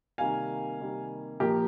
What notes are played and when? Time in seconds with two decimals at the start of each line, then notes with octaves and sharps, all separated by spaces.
0.18 C3 D#3 G3 A#3 F5 G#5
0.80 C3 D#3 G3 A#3
1.40 A#2 F3 A#3 G4 A#4